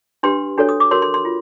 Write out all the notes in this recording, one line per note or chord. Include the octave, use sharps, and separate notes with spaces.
D4 G4 B4 C6
D4 F#4 A4 C#5
D#6
D6
F#4 A#4 C#5 C6
C6
C6
F4